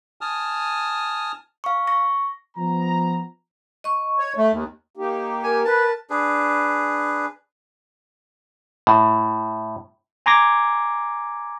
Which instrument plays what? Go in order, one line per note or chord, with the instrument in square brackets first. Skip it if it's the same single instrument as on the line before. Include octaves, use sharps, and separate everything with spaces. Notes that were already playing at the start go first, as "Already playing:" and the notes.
[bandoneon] G#5 A5 D#6 F6
[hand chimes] F5 C#6
C#6 A#6
[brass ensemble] F3 B3 A#5
[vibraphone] D#5 C#6
[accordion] C#5
A3
D#2
[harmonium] A#3 D#4 G4
[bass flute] A#4 [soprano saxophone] G#5
[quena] B4 [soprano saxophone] A5
[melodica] D4 G#4 B4
[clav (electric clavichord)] A2
[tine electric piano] G#5 A#5 C6 D6 G#6 A#6